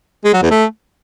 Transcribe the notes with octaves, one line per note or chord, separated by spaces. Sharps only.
G#3
F#3
E2
A3